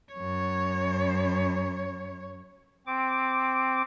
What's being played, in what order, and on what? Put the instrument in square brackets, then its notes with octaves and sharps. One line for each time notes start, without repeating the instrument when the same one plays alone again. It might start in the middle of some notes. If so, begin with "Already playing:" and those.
[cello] F#2 C#5
[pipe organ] C4 D6